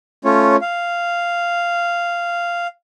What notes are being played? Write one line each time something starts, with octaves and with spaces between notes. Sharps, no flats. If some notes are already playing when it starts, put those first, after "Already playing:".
A3 C#4 F4 C#5
F5